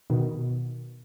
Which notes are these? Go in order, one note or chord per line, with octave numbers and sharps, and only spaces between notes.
B2 D#3